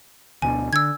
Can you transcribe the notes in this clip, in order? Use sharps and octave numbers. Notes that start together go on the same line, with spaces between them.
D2 B2 D3 G#5
D3 E6 G#6